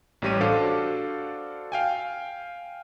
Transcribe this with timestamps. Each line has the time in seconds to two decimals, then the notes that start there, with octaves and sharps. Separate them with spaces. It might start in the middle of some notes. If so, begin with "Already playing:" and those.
0.22 A1 G3 G4 C#5 D#7
0.41 D4 F#4 A4 C5 F5 D6
1.72 F5 G5 G#5